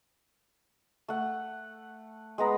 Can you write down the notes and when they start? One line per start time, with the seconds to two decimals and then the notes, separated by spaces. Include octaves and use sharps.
1.08 A3 F#5
2.38 G#3 B3 A#5 B5